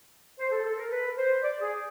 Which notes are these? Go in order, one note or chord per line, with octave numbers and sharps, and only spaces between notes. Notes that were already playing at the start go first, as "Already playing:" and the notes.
C5
A4
A4
A#4
B4
C5
D5
G#4